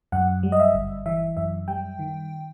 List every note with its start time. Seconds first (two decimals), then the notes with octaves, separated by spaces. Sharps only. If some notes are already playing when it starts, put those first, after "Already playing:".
0.12 F#2 F#5
0.43 G3
0.52 D#5
0.60 E5
0.74 G1
1.06 E3 E5
1.37 F#2 E5
1.68 G3 G5
1.99 D#3